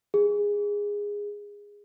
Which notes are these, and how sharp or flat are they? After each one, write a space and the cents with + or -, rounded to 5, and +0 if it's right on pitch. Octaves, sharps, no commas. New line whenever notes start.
G#4 -15